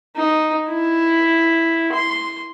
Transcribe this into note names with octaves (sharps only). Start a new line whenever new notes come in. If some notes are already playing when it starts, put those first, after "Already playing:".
D#4
E4
C6